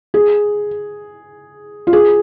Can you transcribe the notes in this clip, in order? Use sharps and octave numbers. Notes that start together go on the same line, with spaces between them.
G#4
F4
G#4